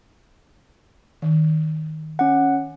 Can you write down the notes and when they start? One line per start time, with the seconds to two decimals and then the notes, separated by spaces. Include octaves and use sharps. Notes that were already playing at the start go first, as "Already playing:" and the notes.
1.22 D#3
2.19 C#4 F#5